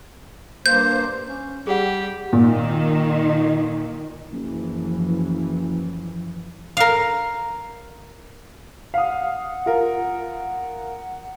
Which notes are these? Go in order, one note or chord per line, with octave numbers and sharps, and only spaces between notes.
G2 A#3 C5 G6
C#4
G3 G4 G#4 F#5
A#2 D#3
F#1 F#2 E3 F3
A#4 F5
F5 F#5 D#6
F4 A#4